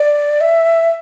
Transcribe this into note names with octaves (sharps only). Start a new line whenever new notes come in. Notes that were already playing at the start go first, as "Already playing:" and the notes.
Already playing: D5
E5